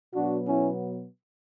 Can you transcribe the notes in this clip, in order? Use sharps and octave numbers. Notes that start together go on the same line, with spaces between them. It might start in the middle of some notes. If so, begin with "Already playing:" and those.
B2 F#3 B3 D4 F#4
C#4 E4